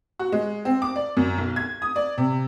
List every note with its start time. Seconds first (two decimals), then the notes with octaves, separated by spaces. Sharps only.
0.19 F#4
0.32 G#3
0.65 C4
0.82 D6
0.96 D5
1.17 F#2
1.38 B1
1.56 G#6
1.82 D#6
1.96 D5
2.18 C3